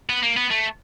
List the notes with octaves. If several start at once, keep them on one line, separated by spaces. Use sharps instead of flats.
B3
A#3
B3
A3